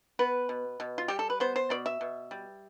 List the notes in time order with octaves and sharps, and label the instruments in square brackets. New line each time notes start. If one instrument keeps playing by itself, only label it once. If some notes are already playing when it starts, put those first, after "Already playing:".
[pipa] B3 B4
B2
B2
F4
G3 G4
A4
B4
B3 C5
C5
B2 D5
E5
B2
G3